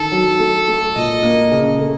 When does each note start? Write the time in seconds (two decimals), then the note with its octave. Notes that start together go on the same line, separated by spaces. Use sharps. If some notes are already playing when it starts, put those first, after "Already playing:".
Already playing: D#3 A4
0.12 F#3
0.39 A3
0.68 A3
0.95 A#2 D#5
1.23 A#3
1.51 C#3
1.79 A3